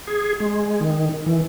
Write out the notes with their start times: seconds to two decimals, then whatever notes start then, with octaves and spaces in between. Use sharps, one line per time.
0.07 G#4
0.40 G#3
0.81 D#3
1.26 E3